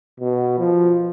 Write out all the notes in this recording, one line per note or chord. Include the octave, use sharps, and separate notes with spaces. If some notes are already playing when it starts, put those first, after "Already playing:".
B2
F3